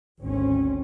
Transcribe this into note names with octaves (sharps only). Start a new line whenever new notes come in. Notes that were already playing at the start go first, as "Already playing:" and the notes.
G#1 D2 C4 C#4